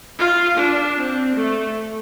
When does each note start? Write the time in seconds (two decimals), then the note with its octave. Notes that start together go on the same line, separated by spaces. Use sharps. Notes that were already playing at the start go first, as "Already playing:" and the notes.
0.19 F4
0.57 D4
0.97 C4
1.35 A3